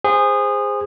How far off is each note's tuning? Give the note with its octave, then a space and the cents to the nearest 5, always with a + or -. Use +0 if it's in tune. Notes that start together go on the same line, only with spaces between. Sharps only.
G#4 -20 C5 -5